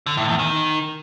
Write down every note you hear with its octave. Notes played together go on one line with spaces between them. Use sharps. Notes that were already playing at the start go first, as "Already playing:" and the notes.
D3
A2
E2
D#3